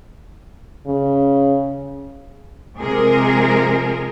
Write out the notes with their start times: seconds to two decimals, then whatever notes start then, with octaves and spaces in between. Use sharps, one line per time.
0.87 C#3
2.77 C3 F3 G#3 G#4 A#4